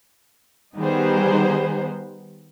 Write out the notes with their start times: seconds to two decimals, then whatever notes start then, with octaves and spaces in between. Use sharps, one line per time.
0.76 D#3 G3 B3 D#4 G#4 C5